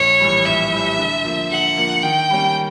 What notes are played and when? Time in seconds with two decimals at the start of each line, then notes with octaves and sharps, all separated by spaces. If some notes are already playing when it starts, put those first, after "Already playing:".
Already playing: A#1 C#5
0.20 A2 E3 G3
0.45 A#1 E5
0.73 A2 E3 G3
0.98 D3
1.25 F3 A#3
1.51 D3 F#5
1.77 F3 A#3
2.03 D#3 G5
2.30 G3 A#3 C#4